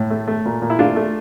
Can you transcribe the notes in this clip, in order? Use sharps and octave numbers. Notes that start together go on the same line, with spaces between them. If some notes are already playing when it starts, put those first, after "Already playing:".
Already playing: A2
A3
A3
A#2
A#2
E4
A3 D4 F4
A3